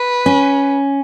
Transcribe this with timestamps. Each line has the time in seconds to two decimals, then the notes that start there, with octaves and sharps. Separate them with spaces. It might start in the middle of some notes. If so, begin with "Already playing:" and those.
Already playing: B4
0.26 C#4